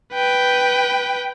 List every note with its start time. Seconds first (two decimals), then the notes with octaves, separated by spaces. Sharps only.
0.13 B4 G5